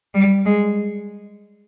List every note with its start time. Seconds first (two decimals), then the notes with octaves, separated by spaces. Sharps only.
0.14 G3
0.45 G#3